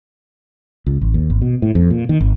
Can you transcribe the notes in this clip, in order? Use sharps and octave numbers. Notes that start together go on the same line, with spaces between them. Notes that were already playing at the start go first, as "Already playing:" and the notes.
C#2
A1
D#2
G#1
B2
A2
F2
A#2
D#3
G#1